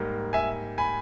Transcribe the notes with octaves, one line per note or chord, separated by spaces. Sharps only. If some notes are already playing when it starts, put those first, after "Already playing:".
Already playing: G#2 G3 A#3
E5 G#5
G#5 B5